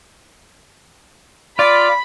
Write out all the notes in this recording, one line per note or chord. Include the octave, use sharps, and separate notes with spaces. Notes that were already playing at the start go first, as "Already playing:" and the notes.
F4 D5 B5